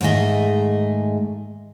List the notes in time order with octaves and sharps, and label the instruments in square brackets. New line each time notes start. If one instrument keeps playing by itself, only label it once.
[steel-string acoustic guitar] G#2 D#3 A3 G#4 D#5 E5